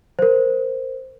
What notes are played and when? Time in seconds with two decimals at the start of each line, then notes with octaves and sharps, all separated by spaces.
0.19 A#4 C5